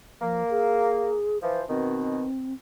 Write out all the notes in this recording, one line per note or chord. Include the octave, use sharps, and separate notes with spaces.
F3 A#3
G#4
E3 F3 C5
B2 D#3 C4